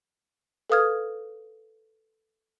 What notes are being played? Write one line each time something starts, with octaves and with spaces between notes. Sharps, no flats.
A4 B4 F5 D#6 F6 G#6